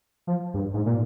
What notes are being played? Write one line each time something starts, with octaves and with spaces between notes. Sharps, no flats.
F3
G2
G#2
A#2